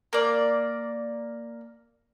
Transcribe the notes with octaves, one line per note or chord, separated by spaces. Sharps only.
A#3 D5